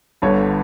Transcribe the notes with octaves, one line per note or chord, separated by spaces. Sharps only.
G1 G2 D3 C#5